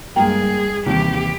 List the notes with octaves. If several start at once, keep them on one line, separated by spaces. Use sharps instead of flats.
G2 G#3 A#3 G#4 G5
D#2 C3 E3 G4